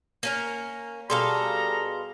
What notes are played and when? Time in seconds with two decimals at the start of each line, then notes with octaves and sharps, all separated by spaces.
0.23 A#3 C#4 A#4
1.10 B2 G3 G#4 A4 F5 A#5 C6